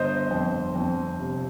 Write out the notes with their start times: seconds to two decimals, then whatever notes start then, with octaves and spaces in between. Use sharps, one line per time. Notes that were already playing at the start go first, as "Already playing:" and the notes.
Already playing: G1 C5 D#5
0.31 F2
0.76 F2
1.19 C3